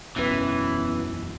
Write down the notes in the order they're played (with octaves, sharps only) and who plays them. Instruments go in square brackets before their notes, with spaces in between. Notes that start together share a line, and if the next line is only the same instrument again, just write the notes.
[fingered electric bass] E1 B1 F#2 [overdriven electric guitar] E3 [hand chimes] B3 C#4 B4